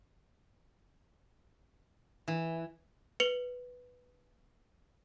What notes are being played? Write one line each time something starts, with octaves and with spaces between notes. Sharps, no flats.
E3
B4 C#7 F7 G7